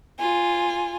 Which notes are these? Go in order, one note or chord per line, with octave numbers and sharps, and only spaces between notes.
F4 G#5